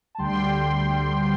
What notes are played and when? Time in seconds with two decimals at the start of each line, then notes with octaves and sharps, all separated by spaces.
0.15 A5
0.18 D2 D3 G3 G5 C6